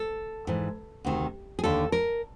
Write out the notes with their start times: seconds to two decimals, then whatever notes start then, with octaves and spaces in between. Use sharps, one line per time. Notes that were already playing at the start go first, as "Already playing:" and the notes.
Already playing: A4
0.47 G#2 E3
1.05 D2 C3 D#3
1.59 G#4
1.64 D#2 D3 A4
1.92 A#4